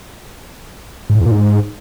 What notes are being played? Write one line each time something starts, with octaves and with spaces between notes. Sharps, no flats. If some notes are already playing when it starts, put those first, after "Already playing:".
G#2
A2
E2
A#2
G#2